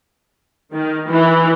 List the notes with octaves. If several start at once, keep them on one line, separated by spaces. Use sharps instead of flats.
D#3
E3